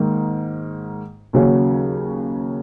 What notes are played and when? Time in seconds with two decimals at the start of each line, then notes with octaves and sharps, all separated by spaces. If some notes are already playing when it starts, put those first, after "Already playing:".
Already playing: G#2 D#3 A#3
1.33 D#2 C#3 F#3 C#4